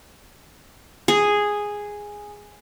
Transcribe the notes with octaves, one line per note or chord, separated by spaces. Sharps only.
G#4